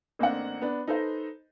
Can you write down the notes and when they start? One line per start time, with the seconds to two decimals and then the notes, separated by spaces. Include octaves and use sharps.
0.19 A1 A#3 C4 D4 F#5
0.62 B3 D4
0.88 D#4 A4 B4 C5 D#5